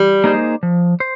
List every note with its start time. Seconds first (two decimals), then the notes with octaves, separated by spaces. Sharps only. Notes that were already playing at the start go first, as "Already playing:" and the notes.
Already playing: G3
0.24 A#3 D#4 G#4 C5
0.63 F3
1.00 C5